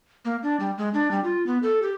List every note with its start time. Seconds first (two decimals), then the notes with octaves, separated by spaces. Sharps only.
0.25 A#3
0.43 D4
0.60 G3
0.78 G#3
0.94 D4
1.11 G3
1.24 F4
1.47 B3
1.63 A4
1.82 G4